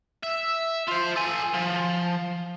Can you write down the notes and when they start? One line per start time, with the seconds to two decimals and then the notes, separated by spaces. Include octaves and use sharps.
0.23 E5
0.88 F4 C5
1.16 A4 G#5
1.54 F3